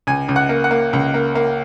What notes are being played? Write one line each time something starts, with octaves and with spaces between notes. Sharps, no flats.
C#2 G#5
C#2
F#5
A#3
F#5
A#3
C#2
A#3
A#3